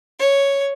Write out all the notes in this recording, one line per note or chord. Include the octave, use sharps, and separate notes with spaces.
C#5